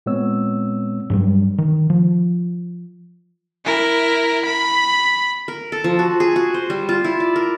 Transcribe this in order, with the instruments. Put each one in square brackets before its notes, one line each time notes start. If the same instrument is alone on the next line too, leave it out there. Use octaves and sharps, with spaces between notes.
[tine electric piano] A#2 G#3 B3 C4 C#5 E6
[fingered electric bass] G2 F#3 G3
D#3
F3
[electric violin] E4 A#4
B5
[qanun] A#4
A4
F3
F#4
G#4
F#4
C5
G3
F4
E4
D5
A#4